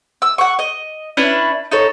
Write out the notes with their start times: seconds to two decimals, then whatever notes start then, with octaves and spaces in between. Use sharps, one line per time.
0.22 E6
0.38 F#5 C#6
0.59 D#5
1.17 C#4 D4 E4 B4
1.71 D#4 A4 C#5